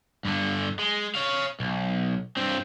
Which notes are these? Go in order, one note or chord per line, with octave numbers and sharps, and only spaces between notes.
G2 D3
G#3
C#5 F5
B1
G2 C4